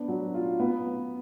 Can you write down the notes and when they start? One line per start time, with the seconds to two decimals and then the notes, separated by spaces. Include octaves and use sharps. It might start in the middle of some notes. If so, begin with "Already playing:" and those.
Already playing: B3 D4
0.08 F#3
0.34 F4
0.60 B3